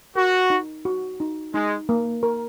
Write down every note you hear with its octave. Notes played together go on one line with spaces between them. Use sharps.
F#4 A#4
D#4
F#4
D#4
G#3 D#4
A#3
A#4